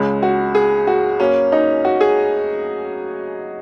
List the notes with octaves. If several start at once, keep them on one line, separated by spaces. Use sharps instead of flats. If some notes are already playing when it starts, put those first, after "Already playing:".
Already playing: C#2 C#3 G#3
F#4
G#4
F#4
F#2 F#3 A#3 C#4
D#4
F#4
G#4